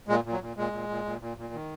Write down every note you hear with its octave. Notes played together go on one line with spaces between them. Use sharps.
A#2 G#3
A#2
F#3
A#2
A#2 G#3
A#2
A#2
A#2
A#2
A#2
D#3